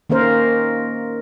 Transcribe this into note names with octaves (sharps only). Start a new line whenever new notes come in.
D#3 A#3 C#4 A#4 C5